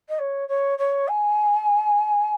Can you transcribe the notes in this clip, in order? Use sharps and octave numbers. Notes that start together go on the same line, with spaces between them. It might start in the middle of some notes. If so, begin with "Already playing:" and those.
D#5
C#5
C#5
C#5
G#5